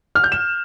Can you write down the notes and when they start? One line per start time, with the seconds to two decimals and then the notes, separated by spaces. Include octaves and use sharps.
0.15 F6
0.24 G6
0.32 E7